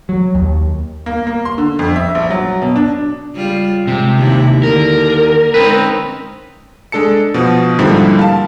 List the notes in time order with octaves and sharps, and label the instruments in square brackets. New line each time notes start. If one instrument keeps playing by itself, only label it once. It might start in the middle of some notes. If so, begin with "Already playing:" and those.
[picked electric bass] F#3
D#2
[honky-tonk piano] A#3
A#3
C6
D3
F2
E5
A#1
F#3
B2
D4
[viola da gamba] C#3 G3 F4
[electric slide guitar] C3 [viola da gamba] G#3
[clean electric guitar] D#2 [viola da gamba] E4
[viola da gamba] D3 [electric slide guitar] A#4
[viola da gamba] G#3 C#4 D#4 [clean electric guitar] C4 B4
[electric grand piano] G#3 D4 A4 A5 C#7
B2 F3
G#2 D3 F3 G3 A#3 E4
F5 A5